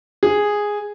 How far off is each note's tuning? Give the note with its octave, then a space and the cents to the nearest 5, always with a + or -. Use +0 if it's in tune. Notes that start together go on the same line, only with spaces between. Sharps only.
G#4 -5